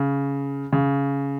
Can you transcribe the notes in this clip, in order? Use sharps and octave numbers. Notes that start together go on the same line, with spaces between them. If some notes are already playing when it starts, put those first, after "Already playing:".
Already playing: C#3
C#3